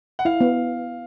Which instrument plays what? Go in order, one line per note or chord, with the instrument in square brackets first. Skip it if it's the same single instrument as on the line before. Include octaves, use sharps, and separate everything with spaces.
[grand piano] F#5
[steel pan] E4 [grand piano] F5
[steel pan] B3